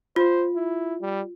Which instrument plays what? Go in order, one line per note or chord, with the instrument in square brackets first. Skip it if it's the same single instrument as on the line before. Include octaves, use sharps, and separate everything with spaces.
[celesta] F4 [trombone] C5
[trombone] E4
G3